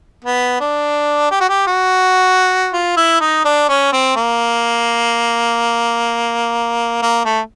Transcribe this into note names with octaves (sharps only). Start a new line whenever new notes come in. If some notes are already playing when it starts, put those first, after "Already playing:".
B3
D4
G4
F#4
G4
F#4
F4
E4
D#4
D4
C#4
C4
A#3
A#3
A3